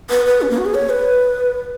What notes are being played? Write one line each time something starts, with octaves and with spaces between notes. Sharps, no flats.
B4
B4
C#4
A#3
F#4
G#4
C#5
B4